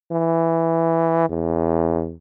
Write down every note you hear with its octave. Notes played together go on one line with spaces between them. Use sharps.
E3
E2